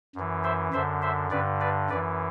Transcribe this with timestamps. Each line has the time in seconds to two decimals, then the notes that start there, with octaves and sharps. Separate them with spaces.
0.15 F#2 E3
0.44 C5 E5
0.73 F#2 D3 C5 E5
1.02 C5 E5
1.31 G2 D3 B4 D5
1.61 B4 D5
1.90 F#2 E3 B4 D5